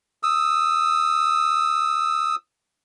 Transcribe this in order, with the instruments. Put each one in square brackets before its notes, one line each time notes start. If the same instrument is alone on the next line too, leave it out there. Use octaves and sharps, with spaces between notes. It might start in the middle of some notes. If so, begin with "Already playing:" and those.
[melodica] D#6 E6